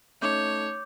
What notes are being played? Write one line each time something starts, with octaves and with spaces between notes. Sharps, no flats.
A3 C#4 D#4 C#5 D6 G6